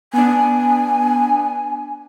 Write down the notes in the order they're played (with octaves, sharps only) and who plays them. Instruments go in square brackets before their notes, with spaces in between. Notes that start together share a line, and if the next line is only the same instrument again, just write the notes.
[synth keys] B3 D4 [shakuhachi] G#5